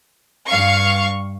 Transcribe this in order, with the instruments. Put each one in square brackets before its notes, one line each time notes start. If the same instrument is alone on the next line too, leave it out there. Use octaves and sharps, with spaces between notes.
[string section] G2 F5 C#6